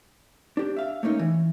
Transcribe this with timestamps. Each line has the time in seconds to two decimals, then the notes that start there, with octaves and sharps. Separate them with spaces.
0.57 D4 G4
0.77 E5 F5
1.03 A3 A#3 C#4 D#4
1.19 E3